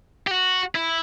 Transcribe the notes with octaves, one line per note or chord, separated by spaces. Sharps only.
G4
F#4
E4